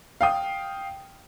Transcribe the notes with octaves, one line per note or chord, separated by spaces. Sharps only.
F5 G5 D#6